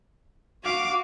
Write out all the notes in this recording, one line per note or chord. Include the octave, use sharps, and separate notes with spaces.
F#4 F5 D6